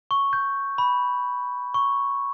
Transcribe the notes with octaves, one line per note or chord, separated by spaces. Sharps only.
C#6
G6
B5
C#6